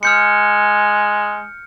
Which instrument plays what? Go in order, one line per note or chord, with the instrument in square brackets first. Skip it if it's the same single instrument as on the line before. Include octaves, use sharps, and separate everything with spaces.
[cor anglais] G#3 [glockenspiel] F6 G6 C#7